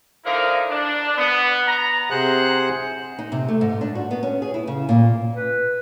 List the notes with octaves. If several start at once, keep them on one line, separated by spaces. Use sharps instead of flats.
D3 F3 D#4 E4 A#4
D4
B3
A#5
C3 G#4 C5 F#5 F#6
D#4
C3
A3
G#2
D4
F#4
B3
C#4
G#4
E4
C#3
A#2
B4